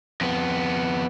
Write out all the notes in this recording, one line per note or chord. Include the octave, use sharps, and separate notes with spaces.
F2 B3